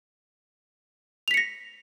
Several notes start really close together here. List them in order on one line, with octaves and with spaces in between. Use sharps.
F7 B6 C#7 A#6